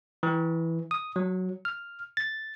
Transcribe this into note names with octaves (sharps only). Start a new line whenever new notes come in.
E3
D#6
F#3
F6
A6